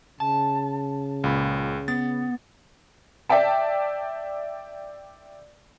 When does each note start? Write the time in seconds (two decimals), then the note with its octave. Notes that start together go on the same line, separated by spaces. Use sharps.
0.20 C#3 A5
1.24 C#2 A#2 B5
1.88 B3 A6
3.29 D5 E5 G5 A5